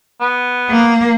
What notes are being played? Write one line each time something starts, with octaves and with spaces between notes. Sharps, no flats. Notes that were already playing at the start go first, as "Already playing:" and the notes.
B3
A#3